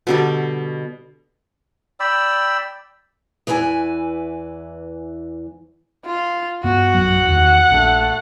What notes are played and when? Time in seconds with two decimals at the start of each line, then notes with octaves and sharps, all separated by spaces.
0.07 B2 D3 G3
2.00 D5 G5 B5 E6
3.47 E2 E3 B4 E5 G#5
6.05 F4
6.64 G2 B3 F#4
6.94 A1 F#2 F#3 F#5
7.27 E2 D#3
7.71 A#1 A3 D4